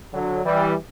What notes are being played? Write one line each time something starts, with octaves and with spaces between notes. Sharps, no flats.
D3 F#3
E3 G3